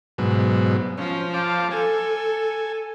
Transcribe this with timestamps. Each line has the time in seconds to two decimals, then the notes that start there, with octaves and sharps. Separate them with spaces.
0.18 G#2 B2 F#3
0.98 F3 C#4
1.34 F5 A5 D6
1.71 A4 G#5